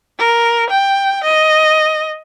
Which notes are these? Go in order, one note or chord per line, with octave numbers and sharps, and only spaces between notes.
A#4
G5
D#5